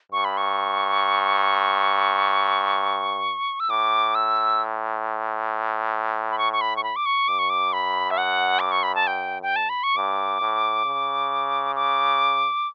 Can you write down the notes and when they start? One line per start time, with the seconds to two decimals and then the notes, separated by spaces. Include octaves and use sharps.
0.12 G2 C#6
0.25 B5
0.37 C#6
3.60 E6
3.70 A2 D6
4.15 E6
6.31 B5
6.38 C#6
6.53 C#6
6.61 B5
6.76 C#6
6.84 B5
6.96 D6
7.06 C#6
7.28 F#2 D6
7.39 C#6
7.50 D6
7.73 B5
8.11 E5
8.18 F#5
8.60 D6
8.71 C#6
8.83 B5
8.95 A5
9.07 G5
9.43 G5
9.56 A5
9.69 B5
9.83 C#6
9.96 G2 D6
10.41 A2
10.86 C#3
11.76 D6